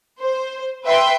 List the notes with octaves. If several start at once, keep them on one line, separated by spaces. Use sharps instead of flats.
C5
B4 E5 G5 C6